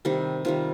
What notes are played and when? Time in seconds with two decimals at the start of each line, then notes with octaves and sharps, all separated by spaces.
0.05 C3 D#3 G3 G4
0.45 C3 D#3 G3 F4